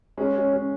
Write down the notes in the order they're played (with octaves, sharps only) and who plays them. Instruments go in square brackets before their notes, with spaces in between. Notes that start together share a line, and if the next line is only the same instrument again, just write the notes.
[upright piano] G#3 [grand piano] C#4
[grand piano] C#4
C#4